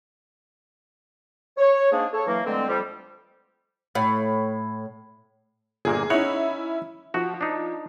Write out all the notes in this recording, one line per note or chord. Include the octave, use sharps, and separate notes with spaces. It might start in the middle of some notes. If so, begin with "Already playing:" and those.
C#5
G#2 A#3 D4 G#4
A4 C#5
E3 F#3 A#3
D3 E3 G#3 A3 C4
F2 F3 G3
A2
G1 A#2 A#3 G#4
C#4 D#4 E4 C#5 F#5
F3 F#4
D4 D#4